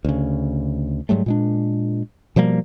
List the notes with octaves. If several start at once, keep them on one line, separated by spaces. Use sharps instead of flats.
D2 C#3
G#2 F#3 G3 A3
A#2 G#3 D4
B2 F3 G3 A#3